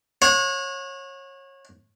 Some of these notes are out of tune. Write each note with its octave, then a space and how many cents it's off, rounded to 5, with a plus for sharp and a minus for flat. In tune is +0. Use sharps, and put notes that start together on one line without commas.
C#5 -25 F#5 -35